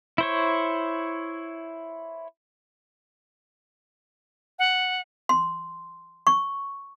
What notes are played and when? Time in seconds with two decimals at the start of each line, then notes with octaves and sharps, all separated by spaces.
0.18 E4 C5 C#5
4.59 F#5
5.29 C6
6.27 C#6